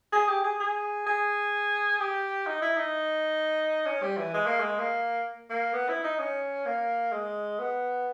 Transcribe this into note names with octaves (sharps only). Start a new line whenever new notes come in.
G#4
G4
G#4
G#4
G#4
G4
D#4
E4
D#4
C#4
G3
E3
G#3
A#3
G#3
A#3
A#3
B3
E4
D#4
C#4
A#3
G#3
B3